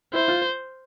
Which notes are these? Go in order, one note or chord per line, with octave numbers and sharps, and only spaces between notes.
E4 C5
F4